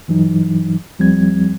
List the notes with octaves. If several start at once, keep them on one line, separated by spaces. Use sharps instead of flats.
G2 E3 F#3 D#4
D#2 F3 G3 C4 G#6